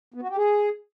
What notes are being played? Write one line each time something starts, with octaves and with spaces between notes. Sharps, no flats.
B3
F#4
G4
G#4